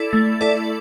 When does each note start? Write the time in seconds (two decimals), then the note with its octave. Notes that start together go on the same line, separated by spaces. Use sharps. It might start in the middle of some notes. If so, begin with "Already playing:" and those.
Already playing: E4 A4 D5
0.13 A3
0.41 E4 A4 D5